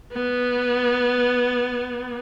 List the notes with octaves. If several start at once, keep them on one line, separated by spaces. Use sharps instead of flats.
B3